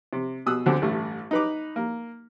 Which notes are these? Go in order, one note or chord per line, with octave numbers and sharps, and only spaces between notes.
C3
B2 D#6 E6 F#6
D2 D3 C4
A1 G2 A3
D#4 B4 D6
A#3